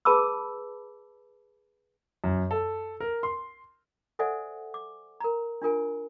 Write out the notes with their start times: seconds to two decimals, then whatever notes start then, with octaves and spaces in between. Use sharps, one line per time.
0.05 G#4 B4 A5 B5 D6 E6
2.24 F#2
2.51 A4
3.00 A#4
3.23 C6
4.19 A4 C5 D5 E5 F#5 G#5
4.74 D6
5.20 A#4 A#5
5.62 D4 F4 A#4 G#5